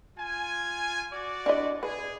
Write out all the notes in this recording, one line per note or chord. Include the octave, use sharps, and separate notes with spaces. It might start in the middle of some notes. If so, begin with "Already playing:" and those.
F4 G#5
F#4 D5
D4 E4 D#5
G#4 B4